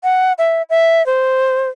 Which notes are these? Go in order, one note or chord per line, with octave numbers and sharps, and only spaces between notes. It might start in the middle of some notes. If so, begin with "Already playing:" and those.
F#5
E5
E5
C5